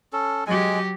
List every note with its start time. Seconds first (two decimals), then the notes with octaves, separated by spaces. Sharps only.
0.13 C#4 A4
0.47 F#3 G#3 G4 G#5